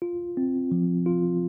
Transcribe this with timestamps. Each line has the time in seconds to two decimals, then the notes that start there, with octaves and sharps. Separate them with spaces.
0.02 F4
0.37 C4
0.72 F3
1.06 F4